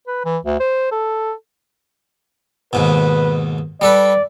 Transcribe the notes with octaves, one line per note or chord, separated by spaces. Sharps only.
B4
E3
D2
C5
A4
D#2 G#2 B2 B4
G3 A4 B4 D5